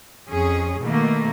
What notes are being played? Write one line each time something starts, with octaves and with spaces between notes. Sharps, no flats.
F2 C#4 G#4
B2 D#3 A3 A#3